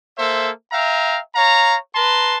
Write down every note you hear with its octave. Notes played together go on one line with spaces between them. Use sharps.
A#3 A4 C5 E5
E5 F5 G5 A#5
C#5 F5 A#5
B4 A5 A#5 C6